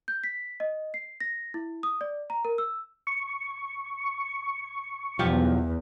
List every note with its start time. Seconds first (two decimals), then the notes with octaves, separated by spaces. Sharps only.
0.08 G6
0.24 B6
0.60 D#5
0.94 C7
1.20 A#6
1.54 E4
1.83 D#6
2.01 D5
2.30 A#5
2.45 A#4
2.58 E6
3.07 C#6
5.19 B1 E2 F3 G4